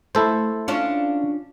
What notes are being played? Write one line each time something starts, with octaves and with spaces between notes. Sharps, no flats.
A3 E4 A4 C5
C#4 D4 F4